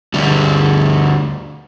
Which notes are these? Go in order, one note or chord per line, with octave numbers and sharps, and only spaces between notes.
D2 G3